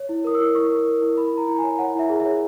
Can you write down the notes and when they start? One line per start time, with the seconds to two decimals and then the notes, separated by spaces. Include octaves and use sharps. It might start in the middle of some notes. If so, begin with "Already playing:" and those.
Already playing: C#5
0.09 E4
0.24 A#4 D#6
0.35 E6
0.40 E4
0.55 E4 C#6
0.71 A#4
0.86 A#4
1.01 E4
1.16 E4 B5
1.33 E4 A#5
1.48 E4
1.58 G#5
1.64 C#5
1.79 C#5 F#5
1.95 E4 E5
2.09 G#4
2.20 E5
2.25 C#5